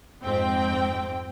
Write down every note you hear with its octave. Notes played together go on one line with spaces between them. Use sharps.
F2 G#2 C4 G5